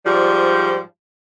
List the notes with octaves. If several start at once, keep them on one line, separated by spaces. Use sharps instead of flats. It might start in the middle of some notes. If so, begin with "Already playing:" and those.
G#2 F3 G3